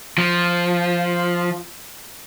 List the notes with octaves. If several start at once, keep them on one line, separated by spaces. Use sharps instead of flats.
F3